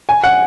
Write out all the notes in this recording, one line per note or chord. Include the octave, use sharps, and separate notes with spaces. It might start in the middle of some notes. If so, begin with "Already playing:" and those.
G#5
F#5